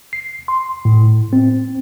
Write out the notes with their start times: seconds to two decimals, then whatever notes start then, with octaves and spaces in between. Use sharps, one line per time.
0.13 C7
0.48 C6
0.85 A2
1.33 C4